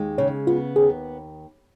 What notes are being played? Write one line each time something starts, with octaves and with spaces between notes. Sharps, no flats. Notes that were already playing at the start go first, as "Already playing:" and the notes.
Already playing: D#2 G#3
C#3 C#5
B3 F4
D#2 G#4